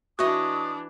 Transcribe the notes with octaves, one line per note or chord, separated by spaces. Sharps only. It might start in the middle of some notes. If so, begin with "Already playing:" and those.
E3 D4 F#4 C#5 D#5 E5 D#6